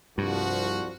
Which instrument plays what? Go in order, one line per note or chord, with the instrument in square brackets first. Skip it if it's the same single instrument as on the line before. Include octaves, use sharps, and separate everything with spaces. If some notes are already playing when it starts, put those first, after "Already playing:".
[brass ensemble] C2 F3 F#4 [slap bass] G2